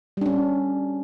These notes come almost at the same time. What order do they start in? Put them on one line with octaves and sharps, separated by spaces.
G3 D4 C#4